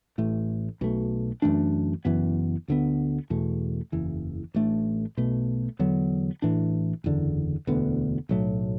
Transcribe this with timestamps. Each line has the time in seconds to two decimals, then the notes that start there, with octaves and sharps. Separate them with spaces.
0.18 A1 A2 A3
0.81 B1 B2 A3
1.42 F#2 E3 A3 D4
2.05 F#1 F#2 E3 B3
2.68 D2 D3 B3
3.30 E2 B2 A3
3.92 F#1 E2 E3
4.54 A1 A2 A3 D4
5.17 B1 B2 A3
5.79 E2 D3 F#3 B3
6.42 A1 A2 E3 D4
7.04 F#1 E2 D3
7.67 E1 D2 D3 B3
8.29 B1 A2 F#3 A3